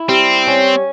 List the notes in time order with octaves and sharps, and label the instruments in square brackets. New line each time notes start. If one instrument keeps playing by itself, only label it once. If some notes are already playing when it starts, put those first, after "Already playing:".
Already playing: [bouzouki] E4
[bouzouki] G3 [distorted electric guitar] C4
[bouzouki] C#4